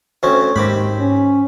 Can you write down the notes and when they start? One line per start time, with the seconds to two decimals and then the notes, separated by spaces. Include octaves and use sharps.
0.23 D2 C4 C#4
0.56 D#2 G#2 C4 G4 B5
1.00 C#4